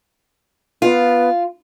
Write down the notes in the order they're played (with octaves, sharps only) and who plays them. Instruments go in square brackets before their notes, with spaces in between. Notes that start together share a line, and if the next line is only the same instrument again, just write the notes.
[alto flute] B3 [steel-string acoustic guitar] F4